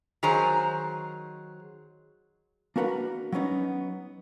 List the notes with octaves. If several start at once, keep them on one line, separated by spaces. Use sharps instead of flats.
D#3 F#3 G#4 C5 A#5
A#3 D4 F#4 A#4 B4 F#5
F#3 B3 C#4 D#4